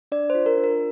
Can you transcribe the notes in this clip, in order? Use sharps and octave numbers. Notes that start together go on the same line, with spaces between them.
D4 D5
C5
F4
A#4
D4
A#4